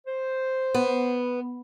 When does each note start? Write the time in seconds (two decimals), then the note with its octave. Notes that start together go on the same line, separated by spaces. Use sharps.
0.07 C5
0.74 B3